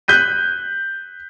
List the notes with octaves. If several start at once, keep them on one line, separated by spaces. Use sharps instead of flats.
F#6 G6 B6 D#7